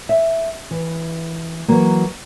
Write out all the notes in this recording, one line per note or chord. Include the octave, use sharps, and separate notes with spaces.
E5
E3
E3 F#3 A#3